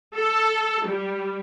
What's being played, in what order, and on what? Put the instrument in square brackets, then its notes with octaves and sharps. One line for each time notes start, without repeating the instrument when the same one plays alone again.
[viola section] A4
G3